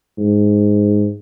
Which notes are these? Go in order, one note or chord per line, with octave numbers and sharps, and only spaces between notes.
G#2